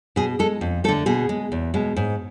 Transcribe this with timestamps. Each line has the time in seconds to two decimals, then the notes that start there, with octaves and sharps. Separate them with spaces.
0.16 B2 G#4
0.39 G#3 A4
0.61 F2
0.84 A3 A4
0.88 D3
1.06 B2 G#4
1.29 G#3
1.52 E2
1.74 B2 G#3
1.96 G#2